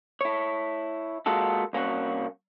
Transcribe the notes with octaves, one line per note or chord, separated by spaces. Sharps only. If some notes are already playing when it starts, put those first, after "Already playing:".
E4 C#5
G#3 A#3 F4 F#4 A4
C2 A#3 C#4 F#4